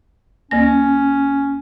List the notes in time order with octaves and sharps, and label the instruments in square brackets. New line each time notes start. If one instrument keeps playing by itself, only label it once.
[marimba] D2 A#3 A#6 [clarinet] C#4